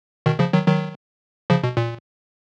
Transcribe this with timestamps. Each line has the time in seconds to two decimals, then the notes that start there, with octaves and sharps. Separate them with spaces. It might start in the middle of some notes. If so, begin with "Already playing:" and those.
0.26 B2 D#3
0.39 C#3 F3
0.53 D#3 F#3
0.67 D#3 F#3
1.50 C#3 F3
1.63 B2
1.77 A#2